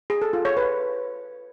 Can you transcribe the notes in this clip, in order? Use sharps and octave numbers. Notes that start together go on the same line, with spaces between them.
G#4
A4
F4
C#5
B4